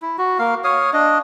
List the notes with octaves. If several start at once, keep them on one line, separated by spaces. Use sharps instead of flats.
E4
F#4
A#3 F5
C#5 F5 D#6
D4 D#5